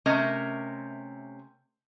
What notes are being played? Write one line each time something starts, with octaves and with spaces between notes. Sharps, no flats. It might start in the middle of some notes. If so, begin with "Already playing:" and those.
C3 A3 C#4 A#4 D#5 E5